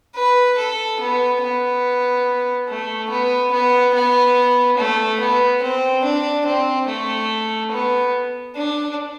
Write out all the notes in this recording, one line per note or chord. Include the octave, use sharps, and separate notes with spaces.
B4
A4
B3
B3
A3
B3
B3
B3
A3
B3
C4
D4
C4
A3
B3
D4